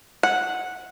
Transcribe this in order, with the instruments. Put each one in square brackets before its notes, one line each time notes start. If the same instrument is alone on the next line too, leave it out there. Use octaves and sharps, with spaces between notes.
[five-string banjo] F#5